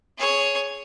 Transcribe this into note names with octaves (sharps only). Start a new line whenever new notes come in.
G#4 C#5